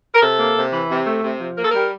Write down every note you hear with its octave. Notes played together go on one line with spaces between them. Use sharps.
A#4
C3 A4
A#3
C3
E3
C3
A3
C3
F3
A#3 A#4
A4
G3 A#4